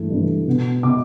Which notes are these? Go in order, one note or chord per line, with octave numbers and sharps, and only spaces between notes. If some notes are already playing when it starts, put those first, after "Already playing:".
Already playing: G2 E3 A3
G2 E3 A3
B2 B3
B2 B3 D6